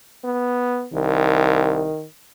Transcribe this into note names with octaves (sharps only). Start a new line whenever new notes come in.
B3
C2 D#3